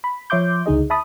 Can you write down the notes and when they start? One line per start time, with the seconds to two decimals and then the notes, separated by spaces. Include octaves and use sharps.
0.04 B5
0.30 F3 C#5 E5 C6 D6 G6
0.66 C#2 D3 D#4 G#4 D#5
0.90 E5 A5 B5 D#6